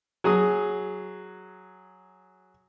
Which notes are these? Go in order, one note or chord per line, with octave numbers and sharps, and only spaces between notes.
F#3 G#4 D#6